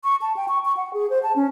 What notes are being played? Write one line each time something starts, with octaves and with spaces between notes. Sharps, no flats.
C#6
A5
G5
C#6
C#6
F#5
G#4
C5
A5
C#4